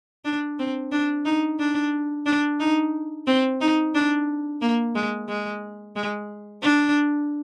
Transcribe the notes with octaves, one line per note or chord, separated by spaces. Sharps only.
D4
C4
D4
D#4
D4
D4
D#4
C4
D#4
D4
A#3
G#3
G#3
G#3
D4